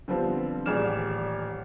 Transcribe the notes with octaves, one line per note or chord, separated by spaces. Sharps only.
D3 F3 G3 B3 C4
D#1 A1 G#4 D5 F6 E7